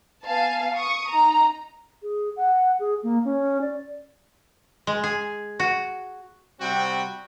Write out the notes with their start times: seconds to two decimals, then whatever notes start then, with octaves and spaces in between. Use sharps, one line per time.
0.24 B3 F5 G#5 A5
0.75 C#6 D#6
1.10 D#4 A#5
2.03 G#4
2.36 F#5
2.80 G#4
3.03 A#3
3.25 C#4
3.61 D5
4.87 G#3
5.04 G#4
5.60 F#4
6.61 C3 G3 C4 F#4 G5